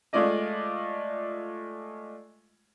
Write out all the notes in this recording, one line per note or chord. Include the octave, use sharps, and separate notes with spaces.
G#3 A3 F4 D5 D#5